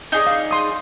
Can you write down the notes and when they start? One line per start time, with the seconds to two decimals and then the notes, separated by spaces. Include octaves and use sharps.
0.12 D#4 G#4 D5
0.27 F5
0.51 C6 D#6